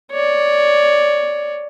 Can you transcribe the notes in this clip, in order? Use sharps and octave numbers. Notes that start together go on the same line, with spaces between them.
C#5 D5